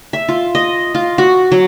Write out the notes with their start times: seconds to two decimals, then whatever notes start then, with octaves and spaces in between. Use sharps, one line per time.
0.13 E5
0.29 F4
0.55 D#5
0.95 F4
1.18 F#4
1.52 F#3